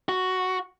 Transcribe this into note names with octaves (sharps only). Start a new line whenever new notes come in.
F#4